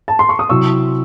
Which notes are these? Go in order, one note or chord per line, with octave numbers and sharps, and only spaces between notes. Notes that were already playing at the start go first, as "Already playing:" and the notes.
A5
C6
C#6
D#6
C3 F#3 C4 E4 C#6 E6